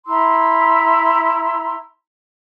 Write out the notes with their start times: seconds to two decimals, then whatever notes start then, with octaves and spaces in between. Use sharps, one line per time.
0.06 E4 A#5 C6 E6